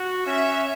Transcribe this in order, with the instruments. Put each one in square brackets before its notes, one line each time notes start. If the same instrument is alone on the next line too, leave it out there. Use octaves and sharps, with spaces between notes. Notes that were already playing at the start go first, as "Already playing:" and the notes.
Already playing: [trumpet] F#4
[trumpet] C#4 [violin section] E5